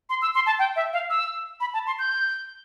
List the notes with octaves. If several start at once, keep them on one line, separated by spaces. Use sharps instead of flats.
C6
E6
C6
A5
G5
E5
F5
E6
B5
A5
C6
G6